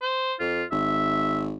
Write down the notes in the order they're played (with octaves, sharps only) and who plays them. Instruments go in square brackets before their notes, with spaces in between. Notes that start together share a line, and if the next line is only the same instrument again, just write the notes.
[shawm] C5
[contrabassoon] F2 [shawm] F4
[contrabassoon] G#1 [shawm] E5